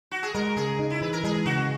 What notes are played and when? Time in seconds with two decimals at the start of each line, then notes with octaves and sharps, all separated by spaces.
0.11 F#4
0.23 G#4
0.34 G#3 A#4
0.56 C#3 G#4
0.79 D#4
0.90 E4
1.01 E3 B4
1.13 A#4
1.24 G#3 G#4
1.46 C#3 F#4